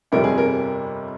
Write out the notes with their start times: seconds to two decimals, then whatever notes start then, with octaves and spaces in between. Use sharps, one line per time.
0.12 G1 F2 C3 G3 A#4
0.24 G#4
0.38 A#4